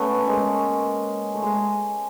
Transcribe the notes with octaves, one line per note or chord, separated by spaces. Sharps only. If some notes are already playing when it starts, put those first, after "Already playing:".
Already playing: A3 B3 C#4
G#3 A#3
A3
G#3